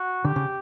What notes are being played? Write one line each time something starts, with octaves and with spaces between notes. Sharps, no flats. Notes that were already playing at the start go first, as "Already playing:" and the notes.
Already playing: F#4
D3 G4
C#3